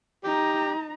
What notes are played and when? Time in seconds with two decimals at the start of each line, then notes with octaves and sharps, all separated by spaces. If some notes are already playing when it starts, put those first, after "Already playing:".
0.24 D#4 G4 A#5